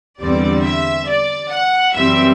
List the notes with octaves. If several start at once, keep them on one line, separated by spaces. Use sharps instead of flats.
E2 D3 G3 C4 D5
E5
D5
F#5
F#2 E3 G3 C4 E5